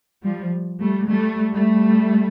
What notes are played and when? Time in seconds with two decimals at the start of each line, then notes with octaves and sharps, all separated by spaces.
0.23 F3 G3
0.81 G3 A3
1.10 G3 A3
1.53 G3 A3